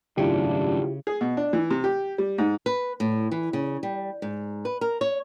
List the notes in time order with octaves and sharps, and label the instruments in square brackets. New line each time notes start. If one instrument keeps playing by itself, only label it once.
[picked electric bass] G#1 F#2 A2 [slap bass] C#3 [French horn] D4 [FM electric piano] E4 F4 G4
[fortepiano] G#4
B2
D4
E3
C3
G4
G3
G#2
[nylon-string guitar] B4
A2
E3
C#3
G3
G#2
B4
A#4
C#5